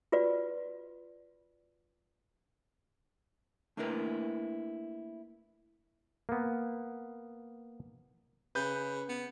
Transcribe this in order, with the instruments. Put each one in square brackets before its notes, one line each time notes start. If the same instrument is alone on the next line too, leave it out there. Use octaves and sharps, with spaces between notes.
[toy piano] F4 F#4 B4 D5
[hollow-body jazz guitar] A3 A#3 D4 E4 A#4 B4
[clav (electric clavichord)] A#3 B3
[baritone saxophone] C#3 [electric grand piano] B4 G6
[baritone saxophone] B3